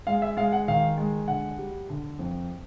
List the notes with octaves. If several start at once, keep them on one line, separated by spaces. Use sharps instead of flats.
G#3 F5
E5
G#3 F5
F#5
D#3 F5
G#3
D3 F#5
G3
D3
F2